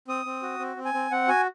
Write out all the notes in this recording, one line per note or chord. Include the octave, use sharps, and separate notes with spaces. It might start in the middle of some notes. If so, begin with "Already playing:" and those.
C4 D#6
C4
F#4
C4
C4
G#5
C4
C4 F#5
F#4 G#5